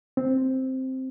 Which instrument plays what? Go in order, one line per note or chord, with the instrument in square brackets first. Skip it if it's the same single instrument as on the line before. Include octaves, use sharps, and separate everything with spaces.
[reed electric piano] C4